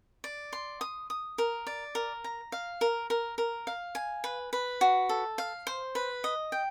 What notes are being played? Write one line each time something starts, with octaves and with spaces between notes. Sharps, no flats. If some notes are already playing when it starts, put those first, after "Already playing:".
D5
C6
D#6
D#6
A#4
D5
A#4
A#5
F5
A#4
A#4
A#4
F5
G#5
B4
B4
F#4
A4
F5
C5
B4
D#5
G5